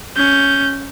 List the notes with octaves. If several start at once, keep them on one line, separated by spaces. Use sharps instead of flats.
C#4 G6